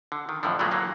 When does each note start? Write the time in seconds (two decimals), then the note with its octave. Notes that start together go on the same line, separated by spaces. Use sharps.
0.12 D3
0.29 D#3
0.43 F2 A2 D3 E3 F3
0.59 G2 A#2 E3 F#3 G#3 A3
0.71 D3 E3 F#3 A#3